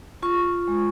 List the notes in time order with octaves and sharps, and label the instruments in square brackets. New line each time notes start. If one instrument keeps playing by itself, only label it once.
[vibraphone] F4 C#6
G#3